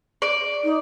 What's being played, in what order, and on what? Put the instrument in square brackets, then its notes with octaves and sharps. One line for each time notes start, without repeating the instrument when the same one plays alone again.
[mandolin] D5
[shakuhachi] D#4